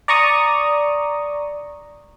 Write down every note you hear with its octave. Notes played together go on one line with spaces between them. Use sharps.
D5 A#5 C#6 D#6